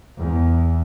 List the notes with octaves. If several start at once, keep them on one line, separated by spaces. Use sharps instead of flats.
E2